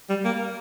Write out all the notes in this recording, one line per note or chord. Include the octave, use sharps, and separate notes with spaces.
G3
A#3